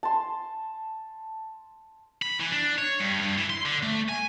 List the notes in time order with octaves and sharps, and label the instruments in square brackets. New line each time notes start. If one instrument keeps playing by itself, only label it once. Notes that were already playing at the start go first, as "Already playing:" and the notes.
[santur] A5 C6
[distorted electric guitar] B5
E3
D4
C#5
G2
G2
E3
C6
D3
A3
G#5